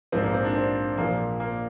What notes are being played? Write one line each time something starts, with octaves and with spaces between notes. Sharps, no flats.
A#1 G#2 F3 C4
A#3
C4
D4
C4
A#1 A#2 F3 A#3
A#3